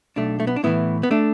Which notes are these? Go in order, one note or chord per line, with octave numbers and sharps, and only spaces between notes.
B1 A3 D4
A3
B3
D4
A2 E3 B3 E4
B3
A3 D4